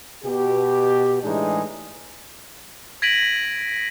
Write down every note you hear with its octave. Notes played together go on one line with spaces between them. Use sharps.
B2 G4
A2 E3 G#3 D4 D#4 G#4
G#6 A#6 B6 D7 D#7 F#7